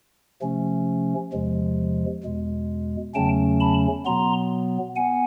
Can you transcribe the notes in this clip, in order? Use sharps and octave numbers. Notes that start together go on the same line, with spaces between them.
C3 F3 A3 C#4
E2 C3 F3 G#3
E2 B2 G#3
E2 C#3 F#3 A3 C#4 G5 A5
A5 B5
B2 F#3 B3 A#5 C6
B3 F#5 G#5